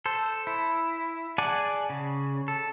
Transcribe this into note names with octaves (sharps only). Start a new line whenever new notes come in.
A4 C5
E4
G#4 D5 F#5 G#5 A5
C#3
A4